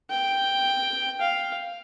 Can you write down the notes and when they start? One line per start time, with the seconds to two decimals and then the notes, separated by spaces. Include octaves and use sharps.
0.11 G5
1.21 F5